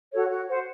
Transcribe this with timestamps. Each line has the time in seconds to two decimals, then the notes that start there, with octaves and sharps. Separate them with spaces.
0.12 F#4 A4 C#5
0.30 F#4
0.48 C5 F#5